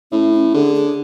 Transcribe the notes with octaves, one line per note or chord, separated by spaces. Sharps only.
A2 C#4
C#4
D3 G#4
G#4